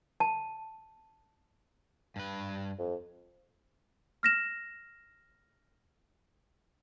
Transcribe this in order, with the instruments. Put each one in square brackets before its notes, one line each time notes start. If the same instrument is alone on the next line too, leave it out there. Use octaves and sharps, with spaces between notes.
[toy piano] A5
[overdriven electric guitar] G2 B4
[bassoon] F2
[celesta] F6 A#6 E7